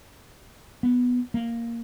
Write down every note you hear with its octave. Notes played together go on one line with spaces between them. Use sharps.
B3
A#3